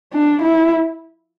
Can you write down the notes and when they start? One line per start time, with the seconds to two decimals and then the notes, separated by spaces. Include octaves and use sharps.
0.14 D4
0.42 E4